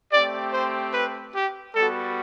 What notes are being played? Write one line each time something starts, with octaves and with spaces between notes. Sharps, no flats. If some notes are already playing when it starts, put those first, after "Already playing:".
A3 C4 G4 D5
C5
B4
G4
G3 B3 F#4 A4